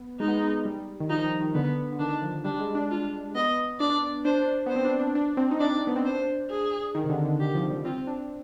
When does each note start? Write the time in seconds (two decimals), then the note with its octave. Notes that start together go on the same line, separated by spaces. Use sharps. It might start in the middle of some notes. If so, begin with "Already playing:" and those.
Already playing: B3
0.20 G#3 D#4
0.28 B3
0.37 G#3
0.65 G3
1.00 D#3
1.10 F3 D#4
1.25 D#3
1.40 D#3
1.54 D3 B3
1.92 D3
1.99 D#3 D4
2.23 F3
2.44 G3 D4
2.59 G#3
2.75 D4
2.90 F4
3.35 B3 D#5
3.80 D4 D5
4.25 D4 C5
4.48 D4
4.66 B3 C5
4.76 C4
4.85 D4
4.99 D4
5.15 D4
5.37 C4
5.51 D#4
5.60 D4 D5
5.87 B3
5.96 C4
6.05 D4 C5
6.50 G#4
6.95 D#3
7.04 C3
7.10 D3
7.25 D3
7.40 D#3 G4
7.55 F3
7.70 G3
7.84 C4 F4
7.98 C4
8.07 D4